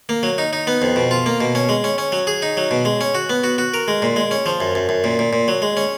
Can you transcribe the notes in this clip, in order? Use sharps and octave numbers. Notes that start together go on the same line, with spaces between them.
A#3
F#3
D#4
D#4
B3
F2
B2
F4
A#3
B2
C#4
G#3
C#4
C#4
F#3
G#4
D#4
F#3
B2
G#3
C#4
F#4
B3
F#4
F#4
A#4
G#3
A#2
G#3
C#4
F3
F#2
F#2
F#2
A#2
A#2
A#2
F#3
G#3
C#4